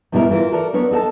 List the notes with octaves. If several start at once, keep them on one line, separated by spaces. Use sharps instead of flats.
F#2 B2 G3 B3 E4 A#4
E3 F4 A#4
F#4 A4 A#4 D5
F#3 B3 D4 A#4 C#5
D#4 A4 F#5 A5